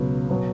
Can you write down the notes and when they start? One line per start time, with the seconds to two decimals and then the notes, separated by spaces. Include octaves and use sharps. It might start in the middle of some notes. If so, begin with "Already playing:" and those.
Already playing: C#2 B2 F#3 B3
0.29 B2 F#3 B3